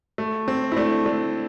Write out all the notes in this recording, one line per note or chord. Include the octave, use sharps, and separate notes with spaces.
A3
C4
E4
A3 D4
A3 D4